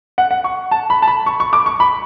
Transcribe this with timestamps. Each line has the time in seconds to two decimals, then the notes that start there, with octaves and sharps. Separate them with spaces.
0.18 F#5
0.31 F#5
0.44 C#6
0.71 A5
0.90 B5
1.02 A5
1.08 B5
1.26 C#6
1.40 C#6
1.53 D6
1.66 C#6
1.80 B5